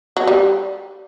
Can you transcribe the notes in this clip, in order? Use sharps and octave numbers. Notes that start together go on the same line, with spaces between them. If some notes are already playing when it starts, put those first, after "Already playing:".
F#3
G3